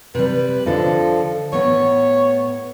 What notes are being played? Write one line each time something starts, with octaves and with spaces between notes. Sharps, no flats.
C3 G3 B4
D3 F3 A4 D#5
A2 B3 C#5